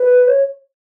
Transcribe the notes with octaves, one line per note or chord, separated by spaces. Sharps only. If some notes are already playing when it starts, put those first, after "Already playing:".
Already playing: B4
C#5